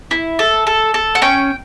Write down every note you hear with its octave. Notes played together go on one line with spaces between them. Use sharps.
E4
A4
A4
A4
F#5
C#4 G5